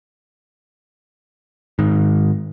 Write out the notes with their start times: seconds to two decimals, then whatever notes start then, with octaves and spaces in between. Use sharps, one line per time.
1.79 G#2 D#3